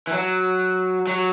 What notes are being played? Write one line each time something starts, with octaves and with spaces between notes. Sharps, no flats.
E3
F#3
F#3